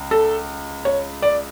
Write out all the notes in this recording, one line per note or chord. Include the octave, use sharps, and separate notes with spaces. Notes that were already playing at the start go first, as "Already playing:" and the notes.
Already playing: C#2
A4
C#5
D5